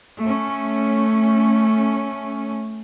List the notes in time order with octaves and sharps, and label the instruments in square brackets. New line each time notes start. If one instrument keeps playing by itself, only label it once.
[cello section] A3 C#4